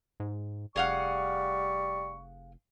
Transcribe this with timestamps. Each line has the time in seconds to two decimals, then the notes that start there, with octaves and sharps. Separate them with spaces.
0.20 G#2
0.76 F1 G3 G#4 F5 F#5 C#6